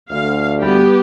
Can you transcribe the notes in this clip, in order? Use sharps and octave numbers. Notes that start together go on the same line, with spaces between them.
D2 D3 F5
G3 B3 G4